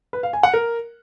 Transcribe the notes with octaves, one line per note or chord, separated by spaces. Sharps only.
B4
F5
G#5
F#5
A#4